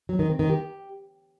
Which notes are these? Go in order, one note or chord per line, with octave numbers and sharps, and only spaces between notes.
F#3
D#3
C4
D#3
G4